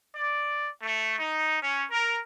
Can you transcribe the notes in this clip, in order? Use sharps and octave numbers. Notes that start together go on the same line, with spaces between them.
D5
A3
D#4
C#4
A#4